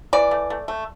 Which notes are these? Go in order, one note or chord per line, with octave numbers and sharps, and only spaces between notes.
E3 D5
A3
A3
A3